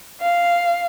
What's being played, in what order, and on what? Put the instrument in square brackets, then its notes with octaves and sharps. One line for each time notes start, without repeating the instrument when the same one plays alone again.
[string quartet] F5